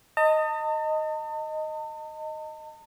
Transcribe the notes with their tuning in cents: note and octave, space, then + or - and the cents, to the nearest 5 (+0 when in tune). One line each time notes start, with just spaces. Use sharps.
D#5 +0 A5 +45